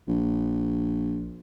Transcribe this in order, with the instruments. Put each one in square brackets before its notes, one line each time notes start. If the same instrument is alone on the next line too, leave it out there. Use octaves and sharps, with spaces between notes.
[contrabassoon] A#1